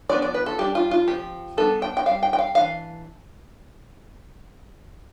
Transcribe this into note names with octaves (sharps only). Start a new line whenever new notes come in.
F3 B3 D4 D5
D5
B4
A4
G3 D4 G4
F4
F4
F3 C4 G4
G3 B3 D4 A4
G5
G5
G3 C4 F5
G5
G5
F5
E3 A3 D4 F5